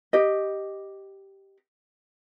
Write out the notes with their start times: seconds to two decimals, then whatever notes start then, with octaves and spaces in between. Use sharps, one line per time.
0.13 G4 D#5